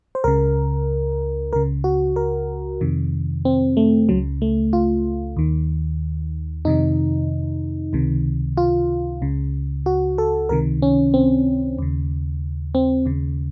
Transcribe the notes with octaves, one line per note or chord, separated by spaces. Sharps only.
C5
C#2 C#3 A#4
C#2 C#3 A#4
F#4
A#4
F2 C3 D#3
C4
A3
C#2 C#3 F#3
A3
F4
D#2 D#3
F2 C3 D#3 D#4
C#2 C3 D#3
F4
C#2 C#3
F#4
A4
C#2 C3 D#3 A#4
C#4
C4
D#2 C#3
C4
D#2 C#3